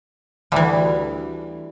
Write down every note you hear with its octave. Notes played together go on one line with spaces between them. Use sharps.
D2 E3 G3